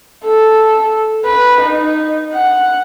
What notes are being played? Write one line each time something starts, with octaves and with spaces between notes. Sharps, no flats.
A4
B4
D#4
F#5